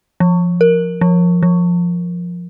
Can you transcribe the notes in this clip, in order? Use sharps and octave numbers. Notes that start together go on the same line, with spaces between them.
F3
A#4
F3
F3